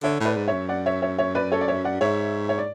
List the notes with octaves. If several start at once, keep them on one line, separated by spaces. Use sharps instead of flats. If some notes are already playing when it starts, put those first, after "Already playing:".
D3 C#5 E5
A2 B4 D5
G#2
C#5 E5
F#2
D5 F#5
C#5 E5
C#5 E5
C#5 E5
B4 D5
A4 C#5
D5
C#5 E5
D5 F#5
G#2 C#5 E5
C#5
D5